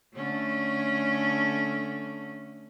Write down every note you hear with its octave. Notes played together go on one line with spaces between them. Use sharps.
D3 A3 C#4